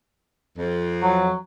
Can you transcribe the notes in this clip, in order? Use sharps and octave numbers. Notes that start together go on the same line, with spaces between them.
F2
F#3